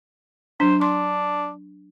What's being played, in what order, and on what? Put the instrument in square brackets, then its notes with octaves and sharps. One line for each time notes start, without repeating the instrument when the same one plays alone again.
[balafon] F#3 D4 [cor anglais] C5
[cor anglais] D4 [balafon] C6